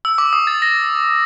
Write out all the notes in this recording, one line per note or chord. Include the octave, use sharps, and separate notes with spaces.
E6
D6
D#6
A6
A#6